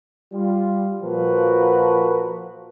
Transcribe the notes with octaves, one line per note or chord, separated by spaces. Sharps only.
G3 F4
A#2 F3 F#4 A#4 B4